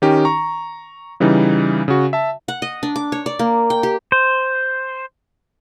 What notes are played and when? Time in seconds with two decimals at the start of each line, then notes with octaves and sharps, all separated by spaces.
0.02 D#3 C#4 D#4 G4
0.25 A#5 C#6
1.20 C#3 E3 G3 D#4
1.88 C#3 F#4
2.13 E5 A5
2.48 F#5
2.62 D#5
2.83 D4
2.96 D6
3.12 C#5
3.26 D5
3.39 A#3
3.70 G5
3.83 G4
4.12 C5